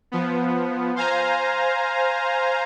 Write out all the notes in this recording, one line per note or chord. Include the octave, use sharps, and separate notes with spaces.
F3 B3
C5 F5 G#5 A#5